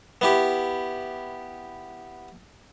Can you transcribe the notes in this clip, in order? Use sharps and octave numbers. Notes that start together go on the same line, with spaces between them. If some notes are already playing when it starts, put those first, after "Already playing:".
B3 E4 G4